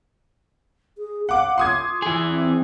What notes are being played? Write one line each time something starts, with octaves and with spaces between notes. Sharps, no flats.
G#4
F5 F#5 D6
F4 C6 D#6 G#6
E3 G#4
C4